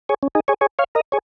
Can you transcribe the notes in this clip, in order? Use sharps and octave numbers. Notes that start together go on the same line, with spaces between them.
G#4 C#5
C#4
D#4 G#4
G#4 C#5
G#4 C#5
C#5 F5
A#4 D#5
G#4 C#5